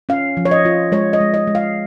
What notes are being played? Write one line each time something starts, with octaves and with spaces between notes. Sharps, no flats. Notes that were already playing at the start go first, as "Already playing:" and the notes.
C#4 F5
F3
C#5
D#5
F4
G#3 C#5
D#5
G#3
D#5
G#3
F5